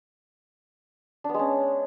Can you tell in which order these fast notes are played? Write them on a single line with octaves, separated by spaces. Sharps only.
D4 B3 G#3 C#4